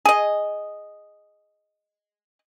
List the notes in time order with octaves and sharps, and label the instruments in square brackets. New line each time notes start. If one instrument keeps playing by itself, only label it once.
[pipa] G#4 D#5